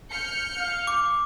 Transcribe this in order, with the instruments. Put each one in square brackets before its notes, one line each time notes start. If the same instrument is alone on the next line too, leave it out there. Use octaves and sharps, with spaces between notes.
[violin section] F6 G6 C#7
[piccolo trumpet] F5
[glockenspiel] D6